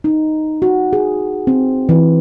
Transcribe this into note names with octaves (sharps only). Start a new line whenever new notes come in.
D#4
F#4
G#4
C4
E3